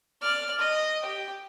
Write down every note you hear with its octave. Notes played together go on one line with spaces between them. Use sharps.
D5 F6
D#5
G4 G5